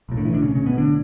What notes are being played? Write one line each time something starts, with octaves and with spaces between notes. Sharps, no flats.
B1 A2
D3
E3
D3 D4
C#3 C#4
C#3 C#4
B2 B3
D3 D4